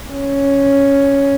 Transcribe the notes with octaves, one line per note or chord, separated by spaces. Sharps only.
C#4